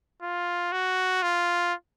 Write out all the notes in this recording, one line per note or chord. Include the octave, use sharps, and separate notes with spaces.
F4
F#4
F4